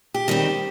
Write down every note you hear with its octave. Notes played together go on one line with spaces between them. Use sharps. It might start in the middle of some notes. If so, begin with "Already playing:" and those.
G4
D#3 G3 C4